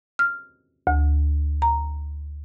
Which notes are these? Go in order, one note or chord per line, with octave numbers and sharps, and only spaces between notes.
F6
D2
A#5